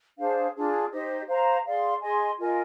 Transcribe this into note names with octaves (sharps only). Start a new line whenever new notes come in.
D4 G#4 C5 F5
D4 F4 G#4
D#4 G4 C5 D#5
C5 F5 A#5
G#4 D5 F5 C6
G#4 D#5 G#5 C6
F4 A#4 D#5 G#5